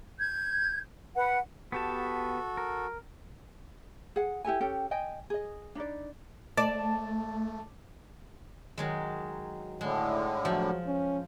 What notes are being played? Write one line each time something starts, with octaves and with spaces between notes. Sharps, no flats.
G6 G#6
B4 F#5
B3 F#4 G4 A4 A5
A#4
G#4 F#5
E4 G4 A4 G#5
C#4 G4 A4 G5
D#5 G5 G#5
G#4 D#5
D4 D#4 B4 D5
A3 D5 A5
D#3 F#3 G#3
A2 D3 G#3
F3 F#3
C#4